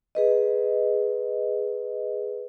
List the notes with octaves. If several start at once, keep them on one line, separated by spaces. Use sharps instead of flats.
G#4 B4 D#5